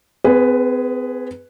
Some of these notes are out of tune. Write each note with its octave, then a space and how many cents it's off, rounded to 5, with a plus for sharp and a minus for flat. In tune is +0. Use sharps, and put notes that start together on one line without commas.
C4 -45 G#4 +0 B4 +0